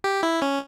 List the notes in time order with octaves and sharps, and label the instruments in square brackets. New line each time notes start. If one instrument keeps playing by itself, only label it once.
[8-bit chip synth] G4
E4
C#4